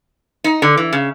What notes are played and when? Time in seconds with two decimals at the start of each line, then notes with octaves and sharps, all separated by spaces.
0.44 D#4
0.62 D3
0.77 E3
0.93 C#3